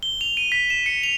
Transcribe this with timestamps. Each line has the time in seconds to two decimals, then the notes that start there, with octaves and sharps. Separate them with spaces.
0.03 G7
0.21 F7
0.37 D#7
0.52 B6
0.70 E7
0.86 C#7
1.03 F7